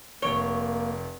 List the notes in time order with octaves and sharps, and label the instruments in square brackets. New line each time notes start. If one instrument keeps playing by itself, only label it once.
[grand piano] F1 D7 G7 [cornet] A#3 [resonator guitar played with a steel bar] C#5